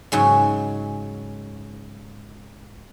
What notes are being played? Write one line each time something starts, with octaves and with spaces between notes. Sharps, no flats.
G#2 C#3 F#3